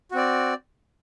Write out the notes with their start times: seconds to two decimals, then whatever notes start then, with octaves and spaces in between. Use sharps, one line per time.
0.11 F#4
0.14 C4
0.17 D5